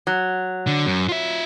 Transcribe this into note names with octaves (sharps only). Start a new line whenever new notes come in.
F#3
D3
F#2
F4 E5